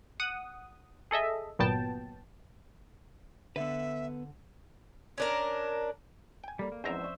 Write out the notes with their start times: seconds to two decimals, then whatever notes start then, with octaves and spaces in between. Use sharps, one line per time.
0.20 F#5 D#6
1.11 G#4 A4 D#5 E5
1.59 G1 A#2 F#3 B3 G5 A5
3.56 D3 B3 A4 B4 E5
5.18 C#4 D4 A#4
6.44 G5 G#5
6.59 G3 A#3 A4 D5 B5
6.72 A#3
6.84 E2 G#2 F3 C4 C#4 C5 E5 A#5
7.01 D5 C#6